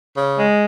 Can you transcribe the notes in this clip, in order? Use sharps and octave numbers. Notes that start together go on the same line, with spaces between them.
C#3
G#3